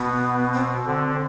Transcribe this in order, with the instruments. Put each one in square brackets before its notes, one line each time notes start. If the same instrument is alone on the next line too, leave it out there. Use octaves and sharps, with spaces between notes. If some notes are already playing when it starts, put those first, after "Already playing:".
Already playing: [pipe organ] B2 [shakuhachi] B3
[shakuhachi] C4
[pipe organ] D3